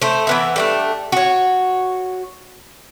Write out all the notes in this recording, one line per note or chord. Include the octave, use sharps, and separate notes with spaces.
A3 C5
E3 B3 E5
G3 A3 D4
F#4 C#5